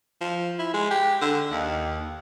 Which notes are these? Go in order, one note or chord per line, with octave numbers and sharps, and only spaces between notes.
F3
E4
G#3
G4
D3
D#2